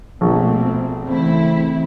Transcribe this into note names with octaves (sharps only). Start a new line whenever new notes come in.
A#1 B2 A3 B3 C4
C#3 E3 A3 C4 E4